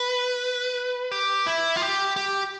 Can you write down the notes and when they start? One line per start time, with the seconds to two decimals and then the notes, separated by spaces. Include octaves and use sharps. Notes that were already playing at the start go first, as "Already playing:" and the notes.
Already playing: B4
1.11 G4
1.47 E4
1.76 F4
1.82 G4
2.16 G4